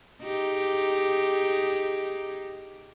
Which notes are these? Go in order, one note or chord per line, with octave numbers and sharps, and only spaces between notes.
D#4 G4 G#4